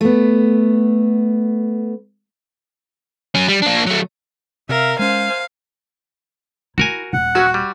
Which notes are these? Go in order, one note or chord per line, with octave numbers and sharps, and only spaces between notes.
A3 B3
F#3 C#4
G3
A#3 D4
F#3 A3
C3 A#4 E5 F5
G#3 C#4 C5 F5 G#5
E4 F#4 A#4 G#5
D#1 F#5
F#3 C#4 F#4
G3